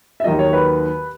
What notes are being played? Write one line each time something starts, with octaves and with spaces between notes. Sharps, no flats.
E5
D#2 D#3 F#3 D#5
C#5
B4